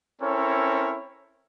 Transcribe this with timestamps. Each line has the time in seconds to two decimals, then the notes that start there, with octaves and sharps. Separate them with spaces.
0.21 C4 C#4 E4 A4 A#4 C#5